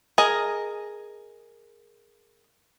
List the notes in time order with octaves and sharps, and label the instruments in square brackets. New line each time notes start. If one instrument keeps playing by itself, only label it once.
[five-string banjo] G#4 A#4 D#5